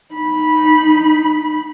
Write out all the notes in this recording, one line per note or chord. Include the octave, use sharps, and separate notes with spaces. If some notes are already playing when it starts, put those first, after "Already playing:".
D#4 B5